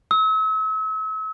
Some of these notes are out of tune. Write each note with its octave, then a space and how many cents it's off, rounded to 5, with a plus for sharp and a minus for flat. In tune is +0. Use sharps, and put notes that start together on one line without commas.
E6 -40